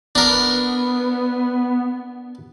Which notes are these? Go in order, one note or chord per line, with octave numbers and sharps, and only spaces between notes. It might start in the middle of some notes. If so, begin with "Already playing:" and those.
B3 D4 A#4